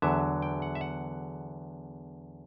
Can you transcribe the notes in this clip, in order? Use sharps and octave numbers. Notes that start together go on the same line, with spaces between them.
E2 D3 F#3 E5
G5
F#5
E5
F#5